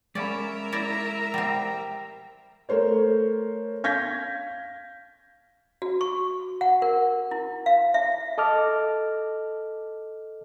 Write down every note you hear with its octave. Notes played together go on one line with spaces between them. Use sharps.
G#3 C#4 A#4 D5 E5 F5 B5
E4 D5 A#6
G3 C4
A3 A#4 C5 C#5
F5 G6 G#6 A#6 B6
F#4
C#6
F#5
A#4
E4
F5
E5
A4 D#5 A5 D6 F6